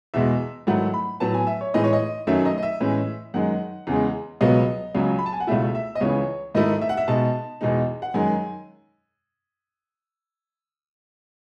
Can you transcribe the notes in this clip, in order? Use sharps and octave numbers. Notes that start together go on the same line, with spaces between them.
E2 B2 G#3 E5
G#2 D#3 F#3 A3 E4 F#5
B5
A2 F#3 B3 A5
G#5
E5
C#5
A2 E3 G#3 D#4 D#5
C#5
D#5
F#2 D#3 F#3 A3 C#4 E5
D#5
D#5
E5
A2 E3 G#3 C#4
F#2 D#3 G#3 F#5
E2 C#3 G#3
C#2 B2 F#3 B3 D#5
C#2 C#3 F#3
B5
A5
G#5
F#5
C#2 B2 A3 E4 E5
E5
D#5
C#2 C#3 E3 C#5
G#2 D#3 A3 E4 D#5
E5
F#5
E5
B2 G#3 D#4 A5
E2 B2 G#3 D#4
F#5
F#2 D#3 G#3 G#5